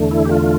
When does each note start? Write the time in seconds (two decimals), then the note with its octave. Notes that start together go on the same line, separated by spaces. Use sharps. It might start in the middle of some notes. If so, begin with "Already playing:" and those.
Already playing: E2 D3 A3
0.11 E4
0.25 G4
0.30 F4